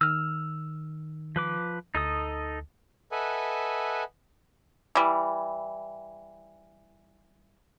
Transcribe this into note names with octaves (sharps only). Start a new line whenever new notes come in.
D#3 E6 F6
F3 B4 D6
D2 D#4 A4 D#6
A4 B4 D#5 E5 F#5 G#5
E3 G3